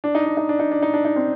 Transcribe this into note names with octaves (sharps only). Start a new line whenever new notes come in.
D4
D#4
D4
D#4
D4
D#4
D4
D#4
D4
D#4
C4 D4